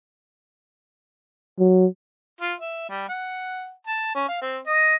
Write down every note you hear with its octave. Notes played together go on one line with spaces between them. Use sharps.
F#3
F4
E5
G3
F#5
A5
C#4
F5
C4
D#5